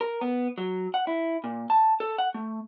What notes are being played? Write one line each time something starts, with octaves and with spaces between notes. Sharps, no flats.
A#4
B3
F#3
F#5
E4
A#2
A5
A4
F#5
A3